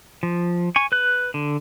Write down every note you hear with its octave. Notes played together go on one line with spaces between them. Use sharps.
F3
G#5 C#6
B4 F#6
D3